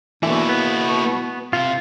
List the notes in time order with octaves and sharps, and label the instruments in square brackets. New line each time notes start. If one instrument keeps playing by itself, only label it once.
[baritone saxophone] B2 [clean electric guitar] D3 E3 [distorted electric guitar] A#3 E4
[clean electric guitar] B3
[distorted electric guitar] C3 [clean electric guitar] F4